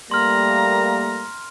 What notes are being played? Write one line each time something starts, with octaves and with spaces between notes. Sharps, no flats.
G3 A3 A#3 A#5 C6 F6